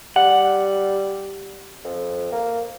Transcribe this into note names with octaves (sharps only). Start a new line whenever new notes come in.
G3 F#5
F2
A#3